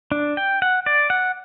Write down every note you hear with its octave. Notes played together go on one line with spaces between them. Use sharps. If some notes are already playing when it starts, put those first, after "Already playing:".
D4
G5
F#5
D5
F#5